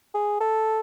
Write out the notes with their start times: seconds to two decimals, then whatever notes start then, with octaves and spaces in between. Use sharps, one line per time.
0.15 G#4
0.41 A4